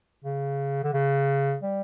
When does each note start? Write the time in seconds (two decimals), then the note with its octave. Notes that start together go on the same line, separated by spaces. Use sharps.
0.24 C#3
0.84 D3
0.94 C#3
1.63 G3